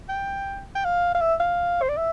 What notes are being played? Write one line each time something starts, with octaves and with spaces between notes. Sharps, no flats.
G5
G5
F5
F5
E5
F5
C5
D5
E5